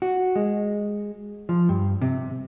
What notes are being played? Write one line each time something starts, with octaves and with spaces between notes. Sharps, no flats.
F#4
G#3
F3
G2
C3